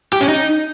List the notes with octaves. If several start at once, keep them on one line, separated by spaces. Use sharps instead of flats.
G4
C#4
D#4